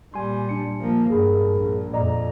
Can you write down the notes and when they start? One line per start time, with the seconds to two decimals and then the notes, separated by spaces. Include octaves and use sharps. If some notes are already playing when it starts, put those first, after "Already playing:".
0.14 A#2 G3 G#5 C6
0.49 D4 C#7
0.80 F3 A#3
1.10 G2 G#4 A#4 B5
1.53 A#1 A#2
1.94 F2 D5 D#5 A#5